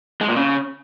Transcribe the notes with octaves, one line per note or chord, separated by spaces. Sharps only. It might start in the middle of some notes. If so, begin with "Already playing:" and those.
G#3
A#2
C#3